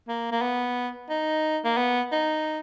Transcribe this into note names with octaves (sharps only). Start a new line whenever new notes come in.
A#3
A#3
B3
D#4
A#3
B3
D#4